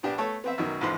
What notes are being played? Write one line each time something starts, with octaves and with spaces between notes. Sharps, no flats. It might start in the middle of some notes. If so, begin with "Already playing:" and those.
A#1 B3 D4 G4
A3 B3 A4 C#5
B3 C4 E5
F#2 B2 D#3
A1 E2 G#2 F3 C6